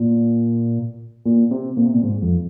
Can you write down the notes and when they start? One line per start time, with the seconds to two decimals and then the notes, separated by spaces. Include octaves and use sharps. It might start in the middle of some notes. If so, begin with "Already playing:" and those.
Already playing: A#2
1.25 A#2
1.51 C3
1.77 A#2
1.86 C3
1.94 A#2
2.03 G#2
2.22 F2